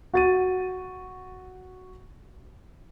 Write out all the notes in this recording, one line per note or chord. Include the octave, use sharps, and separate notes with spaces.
F#4 A6 D#7